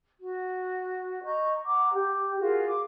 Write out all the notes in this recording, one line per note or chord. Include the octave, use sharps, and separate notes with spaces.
F#4
D#5 A#5 C#6 G6
F#5 A#5 D6
G4
F4 F#4 G#4 A#4
D6